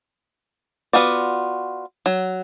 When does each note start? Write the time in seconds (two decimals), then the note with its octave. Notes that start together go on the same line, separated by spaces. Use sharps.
0.93 B3 F4 F#4 D5
2.06 F#3